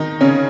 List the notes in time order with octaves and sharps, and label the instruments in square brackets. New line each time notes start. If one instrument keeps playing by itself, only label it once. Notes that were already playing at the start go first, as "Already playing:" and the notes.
Already playing: [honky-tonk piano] D#3 D#4
C#3 C#4